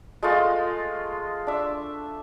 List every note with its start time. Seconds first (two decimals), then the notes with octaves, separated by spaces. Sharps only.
0.23 G#3 A3 F4 D#5
1.47 D4 E5